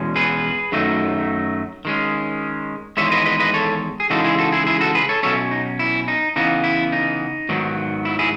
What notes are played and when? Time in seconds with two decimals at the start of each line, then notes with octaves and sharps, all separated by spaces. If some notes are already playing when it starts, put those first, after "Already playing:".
Already playing: E2 B2 G#3 C#4
0.16 G#4 B4
0.72 F#2 D#3 F#3 A3 D#4
1.85 D#3 G#3 C#4
2.97 E2 D#3 G#3 C#5 E5
3.12 B4 D#5
3.26 B4 D#5
3.40 B4 D#5
3.54 A4 C#5
4.00 G#4
4.10 C#3 E3 G#3 D#4 F#4 A4
4.24 E4 G#4
4.38 F#4 A4
4.52 E4 G#4
4.67 E4 G#4
4.81 F#4 A4
4.95 G#4 B4
5.09 A4 C#5
5.23 B2 F#3 C#4 A4 C#5
5.51 D#4
5.79 E4
6.08 D#4
6.36 C#3 E3 B3 D#4
6.64 E4
6.92 D#4
7.49 G#2 D#3 F#3 B3
8.05 E4
8.19 E4 G#4